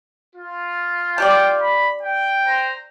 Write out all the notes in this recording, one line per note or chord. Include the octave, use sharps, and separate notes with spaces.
F4
D4 G4 D5 G5
B5
G5
C5 A#5